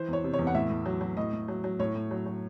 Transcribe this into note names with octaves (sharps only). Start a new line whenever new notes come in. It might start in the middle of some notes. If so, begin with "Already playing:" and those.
Already playing: E3 C5
E2 C#5
C3
C#5
E2
F#5
A2 E5
A2
F#3
F#3
A2 D#5
A2
F#3
F#3
A2 C#5
A2
F#3
F#3